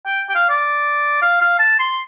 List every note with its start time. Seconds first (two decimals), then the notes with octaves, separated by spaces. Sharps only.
0.06 G5
0.29 G5
0.35 F5
0.49 D5
1.22 F5
1.41 F5
1.59 A5
1.79 C6